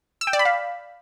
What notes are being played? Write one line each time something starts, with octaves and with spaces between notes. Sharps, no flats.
E6
G5
D5
B5
F5